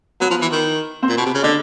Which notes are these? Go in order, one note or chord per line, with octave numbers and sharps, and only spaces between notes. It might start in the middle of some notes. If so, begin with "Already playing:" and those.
F#3 B3 B4
F3
E3
D#3
C4 C5
A#2
B2
C3
C#3
D3 D4 D5